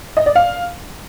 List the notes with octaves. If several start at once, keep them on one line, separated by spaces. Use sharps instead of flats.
D#5
D5
F5